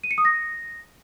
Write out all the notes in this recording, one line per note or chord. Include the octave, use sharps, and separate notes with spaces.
D#7
C#7
D#6
A#6